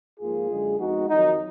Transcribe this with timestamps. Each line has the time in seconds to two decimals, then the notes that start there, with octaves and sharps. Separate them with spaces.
0.20 G#2 F3 A#3 F4 G#4
0.49 F#2 D3 G#3
0.78 F2 F3 G#3 B3 D#4 F#4
1.08 F2 D#3 F#3 D#4